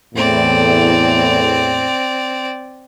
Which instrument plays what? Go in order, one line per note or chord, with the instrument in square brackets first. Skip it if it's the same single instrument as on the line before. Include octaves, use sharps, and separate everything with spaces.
[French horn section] E2 A2 [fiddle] C4 D5